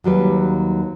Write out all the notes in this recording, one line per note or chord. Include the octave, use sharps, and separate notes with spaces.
D#2 F#3 G3 B4